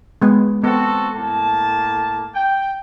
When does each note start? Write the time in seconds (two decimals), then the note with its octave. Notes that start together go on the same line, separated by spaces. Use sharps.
0.22 G#3 B3
0.64 B3 C4 F#4 A4
1.16 A2 A#3 A5
2.35 G5